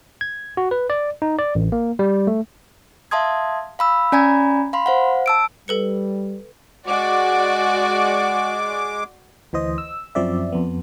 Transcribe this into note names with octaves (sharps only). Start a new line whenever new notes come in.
G#6
F#4
B4
D5
D#4
D5
A1
A#3
G3
A3
E5 F5 A5 C6 D#6 G#6
F5 B5 E6
C#4 D5 G#5 A#5 B5 G#6
F5 B5 C6
C5 F5 F#5
A5 E6 D7
G3 A4 B4 C#7
G#3 F#4 D5 D6
D2 E3 C5 D#5
E6
F#2 F3 C4 D5 E5
F2 B3